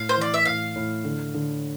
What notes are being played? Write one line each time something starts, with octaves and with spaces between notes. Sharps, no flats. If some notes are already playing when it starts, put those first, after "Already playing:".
Already playing: A2 F5
C5
E3 D5
E5
A2 F5
A2
D3
D3